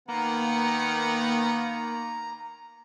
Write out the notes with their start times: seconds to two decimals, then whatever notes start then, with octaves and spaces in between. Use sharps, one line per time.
0.09 D#3 A#3 B3 F#5 A#5